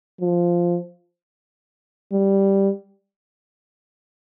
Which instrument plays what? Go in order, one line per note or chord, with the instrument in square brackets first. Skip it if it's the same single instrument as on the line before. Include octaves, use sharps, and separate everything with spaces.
[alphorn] F3
G3